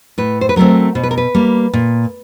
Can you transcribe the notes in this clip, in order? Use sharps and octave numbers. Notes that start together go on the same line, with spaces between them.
A2 B4
C5
B4
F#3 A3 C4 A#4
B2 C5
B4
A#4
B4
G3 A#3
A#2